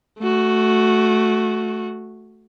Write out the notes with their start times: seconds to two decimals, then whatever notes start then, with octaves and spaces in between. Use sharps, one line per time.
0.19 A3 F#4